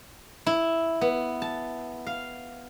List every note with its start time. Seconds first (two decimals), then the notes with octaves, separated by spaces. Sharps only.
0.46 E4
1.01 B3
1.42 A5
2.06 F5